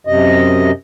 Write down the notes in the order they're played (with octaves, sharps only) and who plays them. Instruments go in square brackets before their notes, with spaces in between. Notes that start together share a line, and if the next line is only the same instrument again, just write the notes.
[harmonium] F#2 C3 D#5